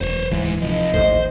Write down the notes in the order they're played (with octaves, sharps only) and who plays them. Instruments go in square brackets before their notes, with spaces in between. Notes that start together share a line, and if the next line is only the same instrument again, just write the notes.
[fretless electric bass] E1 [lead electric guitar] C5 C#5
[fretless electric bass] D1 E3 [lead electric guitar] G#2
[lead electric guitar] C3 F3 [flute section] D#5
[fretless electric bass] A1 D#2 A2 [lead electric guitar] C5